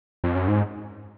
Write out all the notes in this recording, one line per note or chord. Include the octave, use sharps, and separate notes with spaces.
F2
F#2
G#2